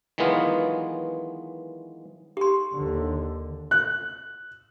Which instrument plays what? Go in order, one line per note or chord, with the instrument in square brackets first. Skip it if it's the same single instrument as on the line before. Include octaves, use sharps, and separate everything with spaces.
[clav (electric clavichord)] D#3 E3 F#3 G#3 B3 F4
[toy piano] G4 C6
[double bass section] D#2 D3
[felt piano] F#6